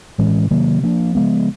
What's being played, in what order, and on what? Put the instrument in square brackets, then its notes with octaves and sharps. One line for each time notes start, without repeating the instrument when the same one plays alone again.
[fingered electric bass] A2 E3 G#3 C#4
C3 D#3 F#3 A#3
F3 A#3 D4
C#3 F3 G#3 B3